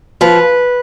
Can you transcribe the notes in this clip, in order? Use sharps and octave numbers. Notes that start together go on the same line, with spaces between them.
F3 B4